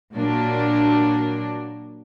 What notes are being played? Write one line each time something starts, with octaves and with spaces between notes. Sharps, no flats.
A#2 F#3 A#3 D4